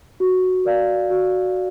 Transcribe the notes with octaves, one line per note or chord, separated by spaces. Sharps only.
F#4
A#4 D5 F5
F#4